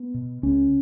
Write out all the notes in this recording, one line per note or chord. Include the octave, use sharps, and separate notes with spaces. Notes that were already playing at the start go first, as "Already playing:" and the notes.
Already playing: B3
B2
C#2 C#4